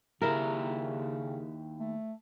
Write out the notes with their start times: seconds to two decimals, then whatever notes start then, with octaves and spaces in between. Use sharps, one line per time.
0.22 D#2 C#3 E4 G4 A#4 E5
1.80 A3